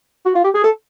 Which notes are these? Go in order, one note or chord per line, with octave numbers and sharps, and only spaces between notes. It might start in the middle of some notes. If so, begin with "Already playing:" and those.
F#4
F4
G4
G#4
A4